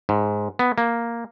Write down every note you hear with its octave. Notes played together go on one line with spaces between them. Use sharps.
G#2
B3
A#3